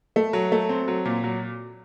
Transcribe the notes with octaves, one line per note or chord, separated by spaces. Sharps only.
A3
F#3
A3
C4
F#3
A#2
F#3